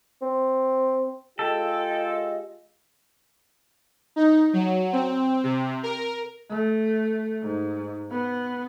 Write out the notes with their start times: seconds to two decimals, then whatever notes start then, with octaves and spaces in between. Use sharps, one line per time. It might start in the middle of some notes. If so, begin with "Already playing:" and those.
0.22 C4
1.39 G#3 F4 G4 A4 D#5 G5
4.16 D#4
4.53 F#3
4.93 C4
5.43 C3
5.83 A#4
6.50 A3
7.43 G#2
8.11 B3